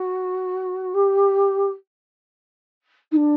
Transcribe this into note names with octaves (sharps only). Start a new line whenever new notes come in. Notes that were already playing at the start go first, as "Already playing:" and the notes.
Already playing: F#4
G4
D#4
D4